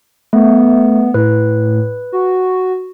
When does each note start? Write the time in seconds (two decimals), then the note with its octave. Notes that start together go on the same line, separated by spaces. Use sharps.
0.33 A3 B3
1.14 A2 B4
2.12 F#4